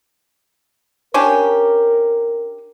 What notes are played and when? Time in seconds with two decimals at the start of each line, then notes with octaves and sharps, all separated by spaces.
1.14 C#4 D4 G4 A#4